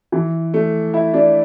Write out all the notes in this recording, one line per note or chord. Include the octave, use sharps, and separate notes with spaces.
E3
A3
E4
D4